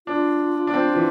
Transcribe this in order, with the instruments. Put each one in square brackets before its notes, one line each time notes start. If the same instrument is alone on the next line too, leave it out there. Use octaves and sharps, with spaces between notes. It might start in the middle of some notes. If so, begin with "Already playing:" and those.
[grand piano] D4 [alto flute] F4
[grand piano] D4
C4
E3